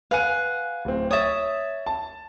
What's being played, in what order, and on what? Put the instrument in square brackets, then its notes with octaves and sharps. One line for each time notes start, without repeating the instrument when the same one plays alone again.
[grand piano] B4 G#5 D#7 [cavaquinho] F5 F#5
[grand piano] D1 C4
[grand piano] C#5 A6 [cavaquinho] E5 D#6
[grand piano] A5